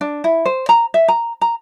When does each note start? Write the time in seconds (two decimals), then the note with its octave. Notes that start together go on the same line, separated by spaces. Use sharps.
0.01 D4
0.24 E4
0.45 C5
0.69 A#5
0.94 E5
1.08 A#5
1.41 A#5